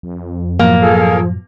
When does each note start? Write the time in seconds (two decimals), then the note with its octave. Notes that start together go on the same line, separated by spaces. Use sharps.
0.03 F2
0.59 F#2 A2 F3 F#3 A#3
0.82 G#4 A4 F5